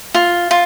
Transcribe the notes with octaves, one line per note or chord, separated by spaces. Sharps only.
F4
F4